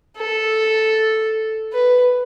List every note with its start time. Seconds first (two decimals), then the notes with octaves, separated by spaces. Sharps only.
0.17 A4
1.73 B4